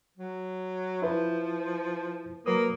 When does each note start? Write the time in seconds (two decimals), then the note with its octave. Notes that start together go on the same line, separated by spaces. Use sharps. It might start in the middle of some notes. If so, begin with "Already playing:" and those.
0.17 F#3
1.02 F3 E4 B4
2.46 F#3 A#3 B4 D#6